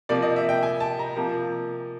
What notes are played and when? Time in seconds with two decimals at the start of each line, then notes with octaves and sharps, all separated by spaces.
0.09 C3 F3 A#3 D5
0.22 D#5
0.36 E5
0.49 G5
0.63 G#5
0.80 A5
0.99 A#5
1.16 C3 F3 A#3